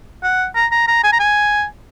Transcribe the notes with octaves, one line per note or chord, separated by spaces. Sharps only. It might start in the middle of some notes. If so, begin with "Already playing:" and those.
F#5
A#5
A#5
A#5
G#5
A#5
G#5